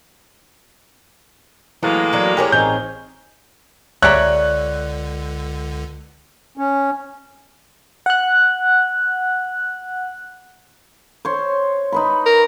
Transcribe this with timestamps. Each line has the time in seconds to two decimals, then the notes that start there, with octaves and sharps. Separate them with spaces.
1.83 A2 E3 F#3 G#3 A#3
2.13 F#3 D5
2.37 G4 G#4 A#4 C#5
2.52 A1 C4 D#4 G6
4.02 C#2 D3 G4 C#5 D5 E5 A#5 F#6
6.57 C#4
8.06 F#5 F#6
11.25 C5 C#5
11.92 D#4 B4 B5
12.26 A#4